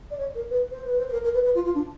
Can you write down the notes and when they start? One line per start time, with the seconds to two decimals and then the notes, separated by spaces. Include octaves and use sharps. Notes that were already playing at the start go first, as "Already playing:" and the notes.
0.11 D5
0.19 C#5
0.35 A#4
0.50 B4
0.71 C5
0.84 B4
0.98 C5
1.08 B4
1.12 A#4
1.24 A#4
1.34 B4
1.44 B4
1.55 F4
1.65 F4
1.75 D4